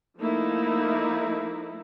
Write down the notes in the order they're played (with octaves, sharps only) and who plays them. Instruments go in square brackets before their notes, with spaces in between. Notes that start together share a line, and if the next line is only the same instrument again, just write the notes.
[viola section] F3 A3 A#3 D#4 E4